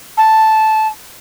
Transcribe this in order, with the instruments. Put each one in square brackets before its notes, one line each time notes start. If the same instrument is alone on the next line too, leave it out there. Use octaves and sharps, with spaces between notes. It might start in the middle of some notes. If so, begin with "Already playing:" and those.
[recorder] A5